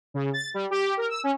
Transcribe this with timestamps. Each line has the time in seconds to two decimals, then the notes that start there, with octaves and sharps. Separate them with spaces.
0.14 C#3
0.33 A6
0.54 G3
0.71 G4
0.97 A#4
1.09 E6
1.24 C#4